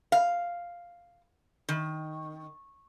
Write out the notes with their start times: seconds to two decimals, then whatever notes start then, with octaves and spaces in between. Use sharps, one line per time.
0.12 F5
1.69 D#3